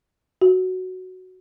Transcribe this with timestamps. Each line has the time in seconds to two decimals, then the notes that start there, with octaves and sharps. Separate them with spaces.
0.42 F#4